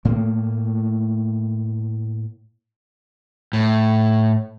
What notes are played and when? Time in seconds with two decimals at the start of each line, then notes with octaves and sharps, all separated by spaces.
0.05 A2 A3 A#3
3.53 A2